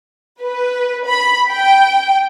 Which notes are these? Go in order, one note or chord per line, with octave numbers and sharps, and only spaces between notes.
B4
B5
G5